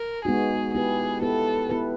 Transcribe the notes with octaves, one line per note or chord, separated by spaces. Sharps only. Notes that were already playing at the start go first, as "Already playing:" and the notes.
Already playing: A#4
G#3 B3 D#4 F#4 G#4
B3 E4 G4 G#4 B4
B3 E4 G4 A4 B4
B3 E4 G4 B4